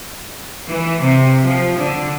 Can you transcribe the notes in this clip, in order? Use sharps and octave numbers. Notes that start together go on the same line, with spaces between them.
E3
C3
F3
D3